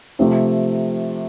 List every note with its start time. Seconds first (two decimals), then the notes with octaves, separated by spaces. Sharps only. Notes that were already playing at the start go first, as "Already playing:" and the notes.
0.19 C3 F3 A3